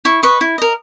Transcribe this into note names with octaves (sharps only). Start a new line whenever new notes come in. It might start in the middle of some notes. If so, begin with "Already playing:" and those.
E4 C#6
B4 D#5 C#6
E4
A#4 D#5